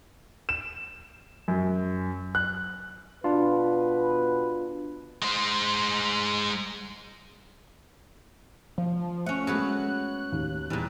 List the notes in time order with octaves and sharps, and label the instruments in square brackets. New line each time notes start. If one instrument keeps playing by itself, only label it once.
[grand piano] E7
F#2
F#6
[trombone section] B2 B4 [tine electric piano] D4 F4
[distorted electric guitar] G#3 C5
[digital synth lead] F3 [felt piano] F5
[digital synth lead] A3 [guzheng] C#4 F#5
[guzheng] F#3 B3 F#4 [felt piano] G#3 A3 [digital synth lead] F#6
[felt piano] D#2
[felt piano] E2 [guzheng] A#2 G3